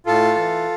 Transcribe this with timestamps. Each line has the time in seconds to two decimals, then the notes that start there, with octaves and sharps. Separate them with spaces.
0.06 A2 F4 A4
0.37 E3